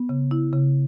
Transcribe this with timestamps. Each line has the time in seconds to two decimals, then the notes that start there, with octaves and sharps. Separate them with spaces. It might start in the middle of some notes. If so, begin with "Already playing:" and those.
Already playing: B3
0.09 C#3
0.31 E4
0.53 C#3